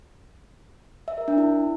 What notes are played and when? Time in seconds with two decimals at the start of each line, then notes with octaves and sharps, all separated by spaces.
1.08 E5
1.18 A#4
1.28 D4
1.38 E4